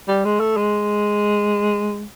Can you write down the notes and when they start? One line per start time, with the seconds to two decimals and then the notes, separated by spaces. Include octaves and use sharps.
0.08 G3
0.25 G#3
0.40 A3
0.57 G#3